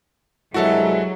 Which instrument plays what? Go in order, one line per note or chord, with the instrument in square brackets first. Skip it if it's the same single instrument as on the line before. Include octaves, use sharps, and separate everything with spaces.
[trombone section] C2 G2 G#3 [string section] F#3 [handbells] E4 E5 [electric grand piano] F#4 A4